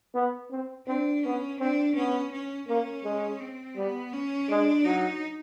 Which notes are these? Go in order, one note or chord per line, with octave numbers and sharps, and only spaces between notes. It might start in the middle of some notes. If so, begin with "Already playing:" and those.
B3
C4
C4 D4
B3 C#4
C4 D4
B3 C#4
C#4
A#3 C#4
G#3
C4
G3 B3
C#4
G#3 D4
F#3 D#4